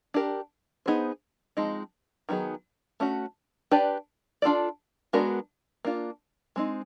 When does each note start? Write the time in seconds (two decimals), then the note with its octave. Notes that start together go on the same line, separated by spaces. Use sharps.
0.14 D4 G4 A#4
0.86 B3 D#4 G#4 C5
1.57 F3 G#3 C4 D#4
2.29 D#3 F#3 B3 D#4 G#4
3.00 A3 C#4 F#4
3.71 D4 G4 B4 D5
4.42 D4 F4 A4 D5
5.13 G#3 B3 D4 F#4 A#4
5.85 A#3 D4 F4
6.56 G#3 C4 D#4